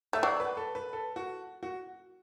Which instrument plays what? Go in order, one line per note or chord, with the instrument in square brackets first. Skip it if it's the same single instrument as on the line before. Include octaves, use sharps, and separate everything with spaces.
[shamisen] A3 [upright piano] E5
[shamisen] F#3 [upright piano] D5
[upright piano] B4
A4
B4
A4
F#4
F#4